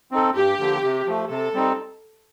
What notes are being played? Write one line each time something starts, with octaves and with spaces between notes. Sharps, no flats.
C4 D#4 A4
G2 G4
D3 F3 A#3
C3
F3 A3
C3 A4
G3 C4 D#4